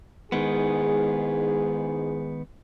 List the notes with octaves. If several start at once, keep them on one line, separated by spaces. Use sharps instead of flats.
G#2 D#3 G#3 B3 E4 G#4